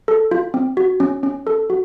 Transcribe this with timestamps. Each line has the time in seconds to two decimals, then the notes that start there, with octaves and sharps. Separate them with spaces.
0.08 A4
0.31 F4
0.54 C4
0.77 F#4
1.00 C#4
1.23 C#4
1.47 A4
1.70 F#4